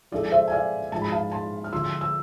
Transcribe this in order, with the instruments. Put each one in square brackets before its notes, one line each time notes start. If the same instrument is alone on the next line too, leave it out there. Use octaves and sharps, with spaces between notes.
[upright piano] F3 G#3 D4 A4 [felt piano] D5
[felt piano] C5 E5
G#5
D5 F5
[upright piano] G#2 F3 G#3 [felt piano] A5
[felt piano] B5
F5 A5
A5 C6
F6
[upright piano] D3 F3 G#3 [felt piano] C6 E6
[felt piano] E6